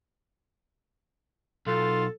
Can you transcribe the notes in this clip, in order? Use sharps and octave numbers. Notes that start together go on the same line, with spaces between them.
B1 F4 A4